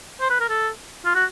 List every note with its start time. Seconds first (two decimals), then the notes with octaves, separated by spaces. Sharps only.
0.20 C5
0.30 B4
0.40 A#4
0.49 A4
1.05 F4
1.15 F#4